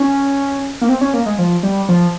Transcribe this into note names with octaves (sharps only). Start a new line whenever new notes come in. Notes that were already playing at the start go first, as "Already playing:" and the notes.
Already playing: C#4
A#3
C4
C#4
A#3
G#3
F3
G3
F3